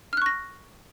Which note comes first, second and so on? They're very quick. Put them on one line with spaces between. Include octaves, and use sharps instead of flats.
F6 F#6 C#6 A#6